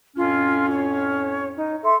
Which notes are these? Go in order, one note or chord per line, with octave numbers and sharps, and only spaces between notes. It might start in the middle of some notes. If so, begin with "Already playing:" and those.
F2 A2 C#4 F4
C#5
D#4
A4 E5 C6